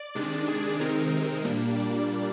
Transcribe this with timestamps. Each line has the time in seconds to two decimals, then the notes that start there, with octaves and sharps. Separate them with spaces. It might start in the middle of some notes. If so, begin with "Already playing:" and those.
Already playing: D5
0.15 C3 D#3 G#3 D4
0.48 G#4
0.79 C3 D#3 G#3 C4 D#4 A#4
1.45 A#2 G3 A#3 D4
1.76 D5